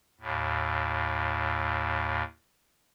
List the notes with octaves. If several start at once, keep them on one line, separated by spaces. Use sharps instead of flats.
D#2 A2